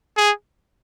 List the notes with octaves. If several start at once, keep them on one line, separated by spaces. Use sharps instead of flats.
G#4